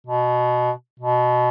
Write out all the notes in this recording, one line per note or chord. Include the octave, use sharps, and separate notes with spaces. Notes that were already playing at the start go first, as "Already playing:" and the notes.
B2
B2